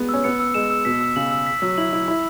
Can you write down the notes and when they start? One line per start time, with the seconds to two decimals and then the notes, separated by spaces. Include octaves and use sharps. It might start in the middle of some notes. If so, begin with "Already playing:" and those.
Already playing: G#3 B3
0.09 C#4 E6
0.24 B3 C#7
0.40 E6
0.54 G#3 E7
0.70 E6
0.85 B2 B6
1.01 E6
1.16 C#3 F#7
1.31 E6
1.46 B6
1.62 F#3 E6
1.78 E4 F#7
1.93 E4 E6
2.08 E4 B5